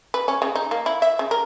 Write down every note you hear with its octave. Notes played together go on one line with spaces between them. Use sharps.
B4
C#4
C#3
D#4
A#3
E4
E5
C#3
A#4